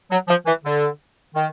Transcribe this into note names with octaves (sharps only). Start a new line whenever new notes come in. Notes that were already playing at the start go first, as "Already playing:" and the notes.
F#3
F3
E3
D3
D#3